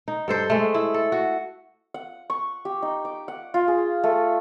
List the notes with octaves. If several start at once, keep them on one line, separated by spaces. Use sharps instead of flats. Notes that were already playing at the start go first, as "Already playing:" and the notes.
D#4
G2 A4 C5
G#3 A3
E4
A4
F#4
F#5
C#6
G4
D#4
D6
F#5
F4
G#4
A3